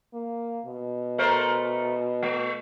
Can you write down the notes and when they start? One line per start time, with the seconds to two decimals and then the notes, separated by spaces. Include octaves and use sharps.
0.13 A#3
0.66 B2
1.18 A3 A#4 C5
2.23 A3